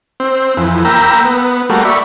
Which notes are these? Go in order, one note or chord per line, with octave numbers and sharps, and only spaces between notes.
C4
F2 E3
A#3 G5 A#5 B5 E6
B3
G3 A3 A#3 F#4
D5 E5 B5 C#6